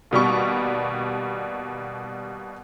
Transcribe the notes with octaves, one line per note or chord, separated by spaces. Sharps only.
D#2 B2 G3 C#6